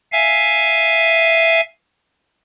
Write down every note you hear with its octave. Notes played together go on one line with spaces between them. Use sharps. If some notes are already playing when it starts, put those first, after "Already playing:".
E5 F5 G#5